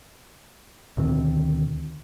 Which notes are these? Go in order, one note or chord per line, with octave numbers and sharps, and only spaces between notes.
D2 B2 D#3 C4